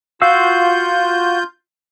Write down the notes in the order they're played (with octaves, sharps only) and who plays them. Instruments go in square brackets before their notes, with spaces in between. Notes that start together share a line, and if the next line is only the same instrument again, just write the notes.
[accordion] F4 G6 [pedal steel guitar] F#4 F5 E6